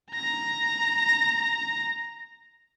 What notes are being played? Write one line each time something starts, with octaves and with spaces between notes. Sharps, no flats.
A#5 A#6